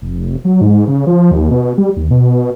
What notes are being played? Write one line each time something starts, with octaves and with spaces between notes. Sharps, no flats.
F1
F#3
G#2
C#3
F3
D#2
B2
B2
G3
D#2
B2